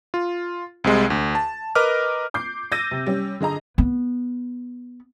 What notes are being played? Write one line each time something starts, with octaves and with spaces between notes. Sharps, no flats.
F4
C2 C3 G#3
D2
A5
A#4 B4 D#5 D6 F6
D6 G6 C7
E6 G6 A6 A#6 D#7
C3
G3 C#4
D3 G#4 D#5 A#5
B3